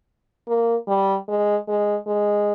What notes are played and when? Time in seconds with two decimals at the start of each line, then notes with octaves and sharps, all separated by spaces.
0.48 A#3
0.88 G3
1.28 G#3
1.68 G#3
2.07 G#3